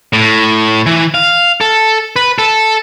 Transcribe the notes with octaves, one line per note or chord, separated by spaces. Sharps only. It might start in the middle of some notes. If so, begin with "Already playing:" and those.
A2
E3
F5
A4
B4
A4